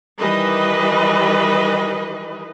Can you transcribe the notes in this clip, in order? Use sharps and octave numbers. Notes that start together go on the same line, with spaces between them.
D#3 E3 G3 B4 D#5